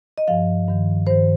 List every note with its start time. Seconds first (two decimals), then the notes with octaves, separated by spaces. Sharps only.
0.18 D#5
0.28 G2 F3 F5
0.68 G2 D#3
1.07 G2 D#3 C5